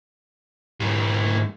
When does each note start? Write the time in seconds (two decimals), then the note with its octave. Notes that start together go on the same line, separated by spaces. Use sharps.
0.80 G#2 E3